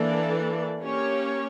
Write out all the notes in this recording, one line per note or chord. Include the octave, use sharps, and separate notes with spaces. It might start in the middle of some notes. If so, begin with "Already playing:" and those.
Already playing: E3 A#3 D4 A4 D5
A#3 C#4 G4 C#5